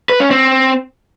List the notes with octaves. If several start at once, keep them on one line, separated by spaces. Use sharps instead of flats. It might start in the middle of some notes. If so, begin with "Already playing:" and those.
B4
C#4
C4